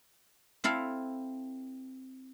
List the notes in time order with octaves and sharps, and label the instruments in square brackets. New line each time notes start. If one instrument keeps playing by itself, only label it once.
[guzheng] C4 E4 A4 F5